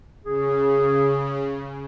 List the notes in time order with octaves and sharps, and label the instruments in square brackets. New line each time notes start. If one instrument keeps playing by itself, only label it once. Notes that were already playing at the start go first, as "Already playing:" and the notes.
[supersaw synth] C#3 [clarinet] G#4